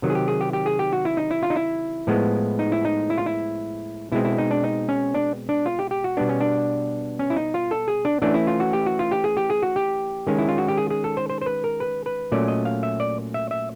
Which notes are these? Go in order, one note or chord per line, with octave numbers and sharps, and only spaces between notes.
C3 D#3 F#3
G#4
G4
G#4
G4
G4
G#4
G4
F#4
E4
D#4
E4
F4
D#4
E4
A2 F3 G#3 B3
D#4
E4
D#4
E4
F4
E4
B2 G#3 C4 E4
E4
D#4
D4
D#4
C#4
D4
D4
F4
G4
G4
F#4
B2 G3 B3 D4
C#4
D4
C#4
E4
D#4
F4
A4
G#4
D4
E3 A3 C#4 D4
E4
F4
F#4
G4
F#4
F4
G4
G#4
G4
G#4
F#4
G4
D#3 G#3 C#4
E4
F4
F#4
G4
G#4
G#4
A4
C5
C5
C5
B4
A#4
B4
B4
A#2 F#3 A3 C#4 D5
D#5
F5
E5
D5
E5
E5